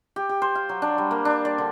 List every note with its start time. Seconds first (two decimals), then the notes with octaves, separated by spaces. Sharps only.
0.16 G4
0.29 G4
0.42 C5
0.55 F5
0.69 F#3
0.82 D4
0.98 G3
1.11 A#3
1.25 D4
1.45 D5
1.58 D3